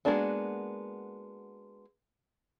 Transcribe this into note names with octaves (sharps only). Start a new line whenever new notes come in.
G#3 A#3 B3 D4 F#4